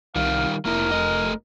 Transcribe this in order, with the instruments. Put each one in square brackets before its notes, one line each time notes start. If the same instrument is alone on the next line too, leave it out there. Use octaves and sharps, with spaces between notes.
[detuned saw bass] C2 [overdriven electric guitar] D#3 G3 [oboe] F5
[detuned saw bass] F1 [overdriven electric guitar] A#3 E4 [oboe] A#4
[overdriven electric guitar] A3 D#5